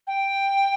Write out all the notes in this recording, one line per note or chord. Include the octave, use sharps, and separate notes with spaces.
G5